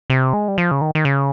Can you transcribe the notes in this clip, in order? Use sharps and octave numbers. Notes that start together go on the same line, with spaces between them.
C3
G#3
G3
F3
C#3
D#3
D#3
C#3